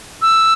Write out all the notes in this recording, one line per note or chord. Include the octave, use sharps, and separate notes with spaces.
E6